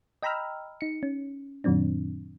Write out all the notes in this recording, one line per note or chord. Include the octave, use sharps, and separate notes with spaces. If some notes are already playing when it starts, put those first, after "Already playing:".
D#5 G5 A#5 B5 E6 F6
D#4 C#7
C#4
F#2 A#2 D#3 F#3 C4 D4